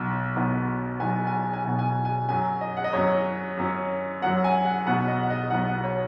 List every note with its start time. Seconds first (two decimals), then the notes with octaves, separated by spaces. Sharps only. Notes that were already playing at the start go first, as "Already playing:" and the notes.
Already playing: B1 B2 B3
0.36 B1 B2 B3
1.00 B1 B2 B3 G#5
1.27 G#5
1.54 G#5
1.64 B1 B2 B3
1.79 G#5
2.05 G#5
2.29 F#2 F#3 C#4 G#5
2.61 D#5
2.77 F#5
2.84 D#5
2.93 F#2 F#3 C#4 C#5
3.57 F#2 F#3 C#4
4.22 F#2 F#3 C#4 F#5
4.44 G#5
4.65 F#5
4.86 B1 B2 B3 F#5
5.08 D#5
5.23 F#5
5.30 D#5
5.50 B1 B2 B3 F#5
5.67 F#5
5.84 C#5